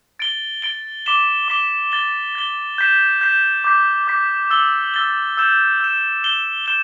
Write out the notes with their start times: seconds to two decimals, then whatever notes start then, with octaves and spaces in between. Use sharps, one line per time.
0.19 A6 D7 G7
0.62 A6 D7 G7
1.06 D6 B6 E7 G7
1.48 D6 B6 E7 G7
1.92 A6 G7
2.35 A6 G7
2.78 G6 B6 E7
3.21 G6 B6 E7
3.64 D6 G6 B6
4.07 D6 G6 B6
4.51 E6 A6 G7
4.94 E6 A6 G7
5.37 E6 G6 E7
5.80 E6 G6 E7
6.23 G6 E7 G7
6.66 G6 E7 G7